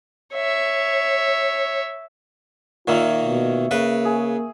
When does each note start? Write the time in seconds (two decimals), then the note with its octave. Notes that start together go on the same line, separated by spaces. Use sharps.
0.35 C#5 E5
2.88 A#2 D#3 A#3 F4 C#5 E5 C#6
3.24 B2
3.71 C#3 A#3 B4
4.05 G#4